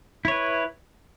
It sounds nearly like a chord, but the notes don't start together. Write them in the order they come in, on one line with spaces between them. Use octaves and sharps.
E4 C#5 B4